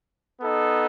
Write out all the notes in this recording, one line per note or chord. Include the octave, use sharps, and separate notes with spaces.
B3 D#4 A4